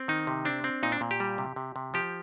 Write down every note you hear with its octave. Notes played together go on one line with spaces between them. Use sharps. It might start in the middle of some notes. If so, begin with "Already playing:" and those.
Already playing: C4
D#3 D#4
C3
C4 D4
C4
A#2 D#4
D4
A#2
G4
G3
C3
C3
C3
F3 G4